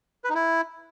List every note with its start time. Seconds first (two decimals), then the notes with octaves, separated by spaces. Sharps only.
0.24 B4
0.30 D#4
0.35 E4